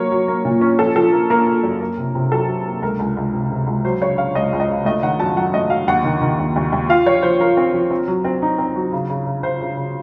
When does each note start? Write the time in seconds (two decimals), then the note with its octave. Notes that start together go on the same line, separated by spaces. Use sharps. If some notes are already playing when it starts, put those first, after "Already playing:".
Already playing: F#3 A#3 C#5
0.12 F#3
0.28 A#3
0.45 A#2
0.61 C#4
0.79 F3 A4
0.96 F3 A4
1.12 A#3
1.30 A#3 A#4
1.47 A#3
1.63 F#2
1.81 A#3
1.98 C3
2.15 C3
2.32 F#3 A4
2.48 F#3
2.66 A#3
2.82 C#2 A#4
2.99 C#2
3.17 C#2
3.34 C3
3.51 C3
3.67 C#2
3.85 F#3 C5
4.01 C#3 C#5
4.18 C#3 F5
4.35 C#2 D#5
4.53 C#2
4.60 D#5
4.68 C#3
4.85 A3 D#5
5.03 D#3 F#5
5.20 F#2 A5
5.37 F#3 F#5
5.53 A3 D#5
5.70 F#3 F5
5.88 D#2 F#5
6.04 D#3
6.21 D#3
6.39 D#2
6.56 D#2
6.72 D#2
6.89 F4 F5
7.06 F3 C#5
7.23 F3 C5
7.40 F3 A#4
7.57 C4
7.74 F3
7.91 C4
8.08 F#3
8.24 C4
8.42 D#4
8.58 C4
8.76 F#3
8.92 C#3
9.10 C#3
9.27 C#3
9.43 C#3 C5
9.61 C#3
9.77 C#3